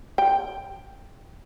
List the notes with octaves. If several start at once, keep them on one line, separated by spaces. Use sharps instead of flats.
G5